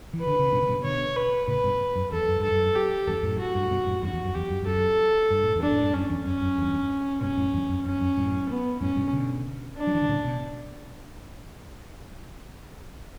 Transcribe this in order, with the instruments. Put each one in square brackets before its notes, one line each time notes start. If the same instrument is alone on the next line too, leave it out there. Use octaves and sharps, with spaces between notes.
[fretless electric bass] E3
[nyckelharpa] B4
[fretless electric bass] D3
C#3
G2 B2
C#3
G2 B2
[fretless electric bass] B2 D3 [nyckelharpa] C#5
[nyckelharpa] B4
[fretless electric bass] A2 C#3 [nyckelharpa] B4
[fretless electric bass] G2 B2
F#2
[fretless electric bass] E2 [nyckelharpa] A4
[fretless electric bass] F#2
[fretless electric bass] G2 [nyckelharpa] A4
[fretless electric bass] F#2
[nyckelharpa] G4
[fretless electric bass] E2 G2 [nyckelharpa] A4
[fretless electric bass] F#2 A2
[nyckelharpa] F#4
[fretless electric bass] G2
A2
G2 B2
F#2 A2
[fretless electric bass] E2 G2 [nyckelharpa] F#4
[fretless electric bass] E2
F#2
[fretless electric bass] E2 [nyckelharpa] G4
[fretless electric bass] F#2
G2
[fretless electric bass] F#2 [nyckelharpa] A4
[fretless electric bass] G2
A2
E2 G2
[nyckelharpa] D4
[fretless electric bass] A2
G2
[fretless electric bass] F#2 [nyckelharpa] C#4
[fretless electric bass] E2
[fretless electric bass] F#2 [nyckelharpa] C#4
[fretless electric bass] F#2
E2 G2
[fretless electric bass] G2 B2 [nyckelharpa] C#4
[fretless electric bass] F#2 A2
E2 G2
F#2
[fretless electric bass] F#2 [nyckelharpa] C#4
[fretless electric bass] F#2
F#2 A2
[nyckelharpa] B3
[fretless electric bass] F#2 A2 [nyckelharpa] C#4
[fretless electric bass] G2 B2
B2 D3
[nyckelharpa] D4
[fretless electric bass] F#3
E3
D3
A2 C#3
B2